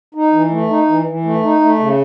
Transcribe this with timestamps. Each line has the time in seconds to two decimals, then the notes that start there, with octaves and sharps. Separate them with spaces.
0.15 D#4
0.33 E3
0.51 A3
0.69 D#4
0.88 E3
1.06 E3
1.25 A3
1.43 D#4
1.61 A3
1.79 C#3